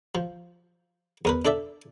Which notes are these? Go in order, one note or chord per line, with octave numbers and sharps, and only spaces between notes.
F3
E2 A#4 B4
D4 A4 D5 E5